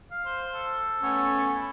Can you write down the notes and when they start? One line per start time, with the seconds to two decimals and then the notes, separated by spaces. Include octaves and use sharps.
0.11 F5
0.25 C5
0.54 A4
1.02 A3 B3 C#4
1.55 E4